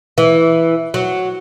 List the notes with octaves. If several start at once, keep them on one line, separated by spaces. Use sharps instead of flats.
E3
F#3